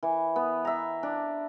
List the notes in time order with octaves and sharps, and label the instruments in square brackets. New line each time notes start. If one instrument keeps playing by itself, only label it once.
[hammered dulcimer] E3
B3
E5 A#5
D4